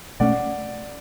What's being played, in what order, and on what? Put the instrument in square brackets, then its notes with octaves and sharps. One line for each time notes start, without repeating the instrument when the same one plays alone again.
[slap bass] B2 A3 C#4 [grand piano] D5 F#5